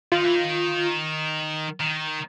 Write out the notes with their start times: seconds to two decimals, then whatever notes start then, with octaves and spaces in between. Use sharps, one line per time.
0.12 D#3 F4
0.24 E3
0.35 D#3
1.81 D#3